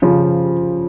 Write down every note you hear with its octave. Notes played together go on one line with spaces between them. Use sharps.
C#3 F3